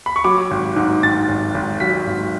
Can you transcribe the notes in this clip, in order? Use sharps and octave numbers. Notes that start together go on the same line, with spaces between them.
B5
C#6
F#3 D6
G#1
G#2
G#2 A6
G#1
G#1
F#3 B6
G#1